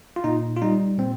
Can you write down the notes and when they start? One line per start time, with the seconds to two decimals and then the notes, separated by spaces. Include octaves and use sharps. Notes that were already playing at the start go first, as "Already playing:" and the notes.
0.16 F4
0.24 A#2 D#4
0.56 F4
0.62 G3 D#4
0.98 A#2 C4